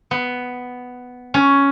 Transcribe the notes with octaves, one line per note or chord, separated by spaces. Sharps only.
B3
C#4